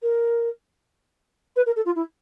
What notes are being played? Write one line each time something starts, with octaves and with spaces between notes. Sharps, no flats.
A#4
B4
A#4
A4
F4
E4